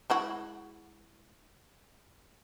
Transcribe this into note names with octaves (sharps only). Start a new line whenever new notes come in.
G#3 E4 F#4